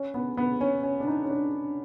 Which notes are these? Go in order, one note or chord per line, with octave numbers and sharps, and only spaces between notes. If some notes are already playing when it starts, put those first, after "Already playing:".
Already playing: C#4
B3
B3
C#4
C#4
D4
D#4
C#4
D4